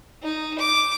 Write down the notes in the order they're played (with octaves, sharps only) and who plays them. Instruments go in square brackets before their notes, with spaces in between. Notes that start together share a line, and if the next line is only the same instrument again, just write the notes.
[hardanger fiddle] D#4
D6